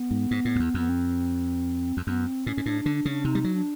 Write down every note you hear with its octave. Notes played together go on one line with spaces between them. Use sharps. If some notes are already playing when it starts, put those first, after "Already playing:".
Already playing: B3
G#2
G#2
A2
F2
E2
F2 B3
C4
F2
F#2 B3
C4
A2 C#4
G#2
A2 D4
D3 D4
D4
C#3 D4
C3 D#4
G3
F#3
D4